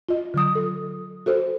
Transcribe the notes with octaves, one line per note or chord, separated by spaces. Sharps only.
F4 D#5
D3 F#3 D#6
A4
F#4 A4 C5